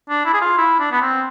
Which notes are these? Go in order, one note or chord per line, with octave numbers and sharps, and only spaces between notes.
D4
E4
G#4
F4
E4
D4
B3
C4